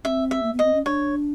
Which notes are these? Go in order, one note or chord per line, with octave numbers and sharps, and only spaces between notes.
C4 C#4 E5
E5
A#3
B3
D#5
C4
C#4
D4 C#5